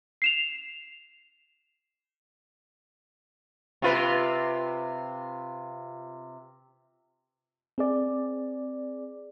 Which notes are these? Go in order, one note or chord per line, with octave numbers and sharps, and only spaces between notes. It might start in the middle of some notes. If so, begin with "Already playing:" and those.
C7 E7 F7
C3 F4 B4
C4 G#4 D5